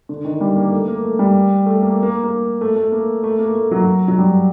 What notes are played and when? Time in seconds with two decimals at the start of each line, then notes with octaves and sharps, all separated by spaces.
0.09 D3
0.25 D#3
0.41 G3
0.56 A#3
0.72 A3
0.88 A#3
1.04 A3
1.19 G3
1.66 A3
1.82 A#3
2.03 A#3
2.24 A#3
2.61 A3
2.76 A3
2.92 A#3
3.24 A3
3.39 A#3
3.55 A3
3.71 F#3
4.08 F#3
4.18 G3